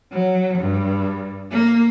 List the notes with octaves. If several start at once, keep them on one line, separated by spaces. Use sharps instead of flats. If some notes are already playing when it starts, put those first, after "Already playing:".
F#3
G2
A#3